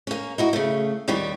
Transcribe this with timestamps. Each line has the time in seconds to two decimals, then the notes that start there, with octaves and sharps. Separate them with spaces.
0.07 A#3 C#4
0.38 D#4 E4 F#4
0.53 C#3 A3
1.08 D#2 D#3 G3 G4 C#5